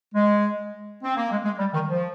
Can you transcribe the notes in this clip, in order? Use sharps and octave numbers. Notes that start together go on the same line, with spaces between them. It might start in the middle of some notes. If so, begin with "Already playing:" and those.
G#3
C4
A#3
G#3
G#3
G3
D#3
F3